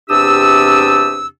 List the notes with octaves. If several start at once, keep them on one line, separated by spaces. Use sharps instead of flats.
E2 C3 D4 G4 D#6 E6